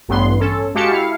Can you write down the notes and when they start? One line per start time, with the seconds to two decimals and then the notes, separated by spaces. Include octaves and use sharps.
0.08 A1 G2 B3 C6
0.40 C#4 A4
0.75 G#3 F#4 G4 F5 A5 C#7
0.90 E4 F5